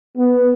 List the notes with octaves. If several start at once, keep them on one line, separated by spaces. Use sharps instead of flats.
B3